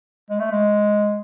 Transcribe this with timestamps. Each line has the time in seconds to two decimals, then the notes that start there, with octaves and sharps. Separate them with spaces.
0.30 G#3
0.39 A3
0.51 G#3